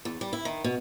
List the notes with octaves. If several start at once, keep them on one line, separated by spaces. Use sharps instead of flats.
E2
G3
E4
D#3
B2